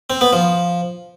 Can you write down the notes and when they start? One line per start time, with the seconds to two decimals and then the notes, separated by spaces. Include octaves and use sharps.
0.10 C4
0.21 B3
0.33 F3